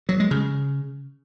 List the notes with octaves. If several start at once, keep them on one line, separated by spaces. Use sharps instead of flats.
F#3
G#3
C#3